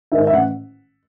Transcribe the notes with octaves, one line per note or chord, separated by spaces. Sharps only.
G#2 D#3 G#3 E5
E5
A1 F#5